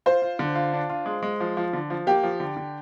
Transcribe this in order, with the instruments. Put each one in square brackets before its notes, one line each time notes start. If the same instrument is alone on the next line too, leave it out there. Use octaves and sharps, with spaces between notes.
[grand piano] F4 [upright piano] C5
[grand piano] F4
D3
F4
D4
F4
G#3
G#3
F3
F3
D3
F3
[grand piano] A#3 [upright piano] G4
[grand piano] F3
D3
D3